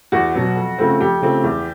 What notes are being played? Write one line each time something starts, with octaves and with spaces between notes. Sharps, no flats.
E2 F#4
B2 F#3 B3
F2
C#3 F3 A3 C4
F2 G4
C#3 F3 A3 C4
E2